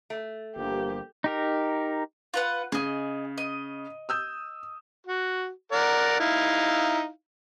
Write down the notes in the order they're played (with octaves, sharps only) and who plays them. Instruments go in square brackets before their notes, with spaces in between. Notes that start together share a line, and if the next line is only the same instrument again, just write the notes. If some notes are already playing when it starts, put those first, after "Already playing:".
[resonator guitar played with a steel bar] A3
[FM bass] G1 [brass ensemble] G2 F3 A#3 [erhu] G4
[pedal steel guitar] D#4 G4 A#4
[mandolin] F4 B4 F#5
[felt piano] C#3 [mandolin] G#4 D#5
[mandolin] D#5
[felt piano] D#6 E6 G6
[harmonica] F#4
A#4 D5 F#5
D#4 E4 F5